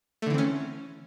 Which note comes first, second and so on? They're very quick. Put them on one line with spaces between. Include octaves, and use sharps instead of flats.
A3 D3 E3 C4 C#4